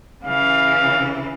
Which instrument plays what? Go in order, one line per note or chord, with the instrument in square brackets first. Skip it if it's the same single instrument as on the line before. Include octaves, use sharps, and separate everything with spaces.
[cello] C#3 E3 [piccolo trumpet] F5